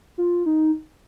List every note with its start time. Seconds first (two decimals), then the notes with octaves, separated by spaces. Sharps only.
0.18 F4
0.46 D#4